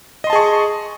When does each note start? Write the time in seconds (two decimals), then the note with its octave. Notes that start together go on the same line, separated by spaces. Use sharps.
0.24 D#5
0.27 C6
0.30 A5
0.33 G#4
0.36 C#6